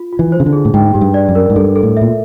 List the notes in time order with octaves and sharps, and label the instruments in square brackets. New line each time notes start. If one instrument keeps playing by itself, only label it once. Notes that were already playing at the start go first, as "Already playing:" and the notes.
Already playing: [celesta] F4
F4
[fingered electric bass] E3
[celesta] C5
[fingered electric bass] C#3
D3
[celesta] G#4
[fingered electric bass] A2
[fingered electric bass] G#2 [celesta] G5
[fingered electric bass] G#2 [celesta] G4
[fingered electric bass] G2
[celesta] D5
[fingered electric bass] F#2
[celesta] A#4
[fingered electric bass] G#2
[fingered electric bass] G2 [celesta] A4
[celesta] A4
[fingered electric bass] A2
[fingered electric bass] A#2 [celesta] E5